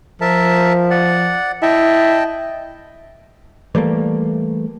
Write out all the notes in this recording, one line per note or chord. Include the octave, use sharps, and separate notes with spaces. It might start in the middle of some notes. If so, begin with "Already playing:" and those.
F3 A#4 E5 A5
D5 F#5
E4 D#5 G5 A5
E3 G3 A3 A#3